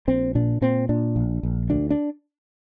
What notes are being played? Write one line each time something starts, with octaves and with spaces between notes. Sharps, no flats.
A#1 C4
A#2 D4
A#2 C4
A#2 D4
A#1
A#1
D2 D4
D4